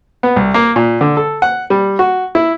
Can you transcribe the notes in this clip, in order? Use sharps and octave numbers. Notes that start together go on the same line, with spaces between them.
B3
C2
A#3
A#2
D3
A4
F#5
G3
F#4
E4